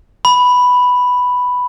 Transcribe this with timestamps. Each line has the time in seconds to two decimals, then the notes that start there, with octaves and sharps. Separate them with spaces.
0.25 B5